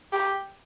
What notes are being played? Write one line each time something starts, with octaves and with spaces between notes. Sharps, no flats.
G4